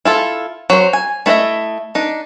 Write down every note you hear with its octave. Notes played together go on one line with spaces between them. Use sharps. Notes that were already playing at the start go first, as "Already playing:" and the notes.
E4 F4 A4
F#3 C5
G#5
A3 E4 A#4 D#5 E5
D4 D#4